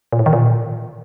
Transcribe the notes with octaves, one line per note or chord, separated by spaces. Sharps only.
A#2
A2
D#3
A#2